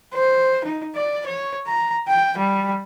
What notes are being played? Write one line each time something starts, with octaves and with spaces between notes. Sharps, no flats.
C5
D#4
D5
C#5
A#5
G5
G3